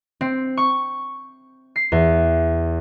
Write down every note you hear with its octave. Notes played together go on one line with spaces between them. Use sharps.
C4
C#6
C7
E2